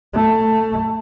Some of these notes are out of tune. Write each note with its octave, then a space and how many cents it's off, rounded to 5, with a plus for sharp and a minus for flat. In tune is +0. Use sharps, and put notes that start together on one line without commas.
A3 +15